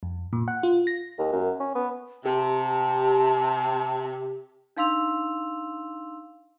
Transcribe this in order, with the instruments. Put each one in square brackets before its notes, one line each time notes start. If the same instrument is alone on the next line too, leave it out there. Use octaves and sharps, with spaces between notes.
[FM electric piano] F2
A#2
F#5
F4
A#6
[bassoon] D#2
F#2
C#4
B3
[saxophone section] C3 [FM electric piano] G4 [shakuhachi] A5
[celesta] D4 D#4 F5 C6 E6 F7